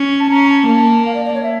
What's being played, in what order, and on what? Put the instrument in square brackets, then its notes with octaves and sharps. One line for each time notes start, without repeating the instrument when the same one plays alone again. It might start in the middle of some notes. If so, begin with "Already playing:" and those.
Already playing: [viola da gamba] C#4
[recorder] A5
[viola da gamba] C#4 [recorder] A#5
[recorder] A5
[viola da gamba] A#3
[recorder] F5
D5
D5
C#5
E5